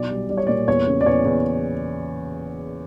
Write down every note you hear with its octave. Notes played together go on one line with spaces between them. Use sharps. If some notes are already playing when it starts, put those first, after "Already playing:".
Already playing: B1 D5
G3
G3 D5
C#5
A#2 D5
E2 C#5
C#3
D5
E2 C#5
E2